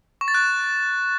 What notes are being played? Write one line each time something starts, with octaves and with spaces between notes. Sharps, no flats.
C#6
A6
F#6